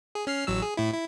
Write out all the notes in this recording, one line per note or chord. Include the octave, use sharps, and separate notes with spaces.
G#4
C#4 F6 C7
A1 F#3 E6
G#4
A2 E4
E4